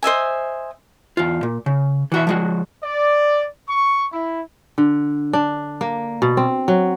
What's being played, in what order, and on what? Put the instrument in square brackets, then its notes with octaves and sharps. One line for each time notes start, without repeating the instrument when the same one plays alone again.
[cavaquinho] C5 D#5 E5 G#5
[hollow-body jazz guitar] E2 F4
A#2
C#3
E3 F#4 E5
F3 G#3 F#4
[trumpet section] D5
C#6
E4
[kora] D3
D4
A#3
B2
C4
F#3